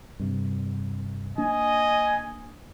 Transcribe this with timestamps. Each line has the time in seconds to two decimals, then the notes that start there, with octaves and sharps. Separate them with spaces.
0.20 G2 C3
1.38 A#3 D4 D#5 G#5